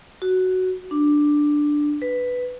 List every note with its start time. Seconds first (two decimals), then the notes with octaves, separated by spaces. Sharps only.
0.22 F#4
0.91 D4
2.02 B4